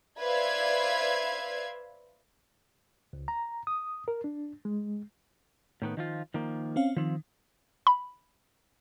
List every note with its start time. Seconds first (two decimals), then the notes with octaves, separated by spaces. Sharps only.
0.19 B4 C5 D5 E5 F5 G#6
3.13 C#2
3.28 A#5
3.67 D#6
4.08 A#4
4.24 D4
4.65 G#3
5.82 A2 D#3 B3
5.97 D#3 F3 F4
6.34 D#3 F3 A#3
6.76 C4 C#4 F5
6.97 D#3 F3 C4
7.87 B5